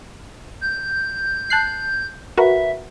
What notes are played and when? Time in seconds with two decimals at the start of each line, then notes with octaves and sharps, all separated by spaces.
0.61 G6
1.50 A5 F#6 C7
2.38 F#4 A#4 B4 E5